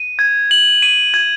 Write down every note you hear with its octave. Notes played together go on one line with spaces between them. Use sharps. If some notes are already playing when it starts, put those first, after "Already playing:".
Already playing: D#7
G#6
F#7
D#7
G#6